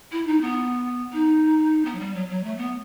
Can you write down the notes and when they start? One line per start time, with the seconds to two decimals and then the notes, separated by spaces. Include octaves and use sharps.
0.12 E4
0.27 D#4
0.41 B3
1.13 D#4
1.85 B3
1.95 F#3
1.99 G3
2.15 F#3
2.29 F#3
2.44 A3
2.57 B3